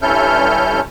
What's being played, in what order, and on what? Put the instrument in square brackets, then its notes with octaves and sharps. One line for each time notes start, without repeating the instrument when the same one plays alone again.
[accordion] G2 C#4 E4 A4 F6 G6